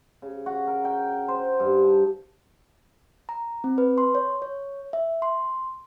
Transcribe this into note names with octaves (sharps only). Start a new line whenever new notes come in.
C#3
F#4
A#4
G5
C5
G2
A5
A#5
C4
B4
C6
C#5
C#5
E5
C6